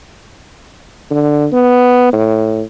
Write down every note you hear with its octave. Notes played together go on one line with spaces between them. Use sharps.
D3
B3
A2